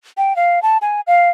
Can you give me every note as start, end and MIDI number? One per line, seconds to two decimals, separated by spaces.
0.17 0.36 79
0.36 0.62 77
0.62 0.78 81
0.82 1.01 80
1.07 1.30 77